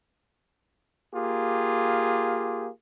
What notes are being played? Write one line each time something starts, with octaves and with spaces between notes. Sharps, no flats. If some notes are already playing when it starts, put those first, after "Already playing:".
A#3 F4 G4 G#4